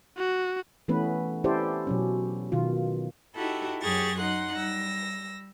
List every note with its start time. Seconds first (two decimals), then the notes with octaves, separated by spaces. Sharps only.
0.17 F#4
0.88 E3 A3 B3 C#4 B4
1.44 C#4 E4 G4 A4 C5 D5
1.87 B2 F#3 C#4
2.52 B2 D#3 F4
3.35 D#4 E4 F#4 G4 A4
3.82 F#2 F#3 G4 G#4 C#6 A6
4.19 D#4 F#5 C6 F#6
4.56 G3 E6 A#6